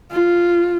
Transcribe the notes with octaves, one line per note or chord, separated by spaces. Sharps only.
F4